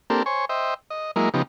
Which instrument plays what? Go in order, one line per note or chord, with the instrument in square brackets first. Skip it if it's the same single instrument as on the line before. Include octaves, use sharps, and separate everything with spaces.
[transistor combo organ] A#3 C4 D4 G4 A4 A#4
C5 C#5 G#5 C#6
C5 D#5 E5 G5
D#5
F#3 G#3 A#3 E4 A#4 D#5
C#3 F3 B3 D#4 G4